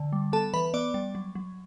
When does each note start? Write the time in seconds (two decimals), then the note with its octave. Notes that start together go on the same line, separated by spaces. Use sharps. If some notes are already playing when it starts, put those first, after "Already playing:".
Already playing: D3
0.13 G3
0.33 B3 A4 A5
0.54 E3 B4 B5
0.74 B3 D5 D6
0.94 G3
1.15 F#3
1.35 F#3